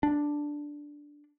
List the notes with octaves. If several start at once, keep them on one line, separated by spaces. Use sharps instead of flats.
D4